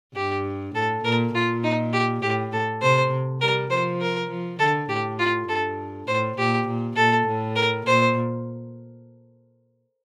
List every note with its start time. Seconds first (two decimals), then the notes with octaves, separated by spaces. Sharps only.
0.15 G2 G4
0.75 A2 A4
1.04 A#2 A#4
1.34 A#2 F4
1.64 D#4
1.93 G4
2.22 A2 G4
2.53 A4
2.82 C3 C5
3.41 G3 A#4
3.70 F3 C5
4.01 A#4
4.30 F3
4.59 D3 A4
4.89 A2 G4
5.19 F4
5.49 G2 A4
6.08 A2 C5
6.38 A#2 G4
6.67 A#2
6.96 A#2 A4
7.27 A2
7.56 A#4
7.86 A#2 C5